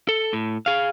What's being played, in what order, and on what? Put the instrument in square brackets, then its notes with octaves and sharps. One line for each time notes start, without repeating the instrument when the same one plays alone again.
[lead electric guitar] A4
A2
G#4 F5